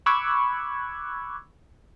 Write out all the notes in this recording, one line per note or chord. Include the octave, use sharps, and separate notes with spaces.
B5 C#6 D6 E6 F#6 G#6